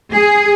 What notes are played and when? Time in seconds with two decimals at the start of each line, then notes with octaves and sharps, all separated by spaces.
0.12 G#4